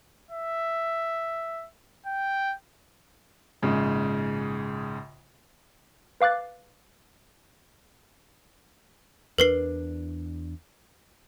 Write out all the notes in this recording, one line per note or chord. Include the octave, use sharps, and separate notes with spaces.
E5
G5
A#1 G#2 C#3
B4 F5 D6 F#6 A6
E2 A#3 D4 A#4 B4 C7